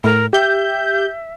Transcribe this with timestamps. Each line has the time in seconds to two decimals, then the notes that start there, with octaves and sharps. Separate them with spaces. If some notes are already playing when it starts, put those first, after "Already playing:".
0.04 A2 A#4
0.33 G4 E5 G6